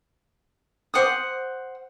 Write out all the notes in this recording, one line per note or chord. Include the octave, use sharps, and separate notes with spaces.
C5 F#5 D6 D#6